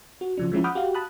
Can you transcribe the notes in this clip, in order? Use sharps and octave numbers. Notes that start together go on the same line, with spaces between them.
F#4
C#3 F3 D4
F3 G#3 C#4 E4
F#5 B5 D6 D#6 F6 G6
F#4 G4 F5
A5 B5 D#6 F#6